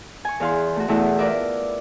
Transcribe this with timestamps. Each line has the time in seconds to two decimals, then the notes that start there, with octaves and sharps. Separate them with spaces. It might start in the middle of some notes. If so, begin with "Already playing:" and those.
0.25 G#5 C#6
0.40 E2 G#4 F5 C6
0.76 A3 F#4
0.88 E2 B2 A3 E4 F#5 E6
1.19 F4 A#4 B4 D5 E5